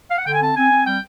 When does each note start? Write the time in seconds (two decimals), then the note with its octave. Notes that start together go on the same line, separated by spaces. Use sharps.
0.11 F5
0.18 F#5
0.26 D3 G5
0.33 G#5
0.42 C4 A5
0.56 C4 G#5
0.71 C4
0.86 G3 G5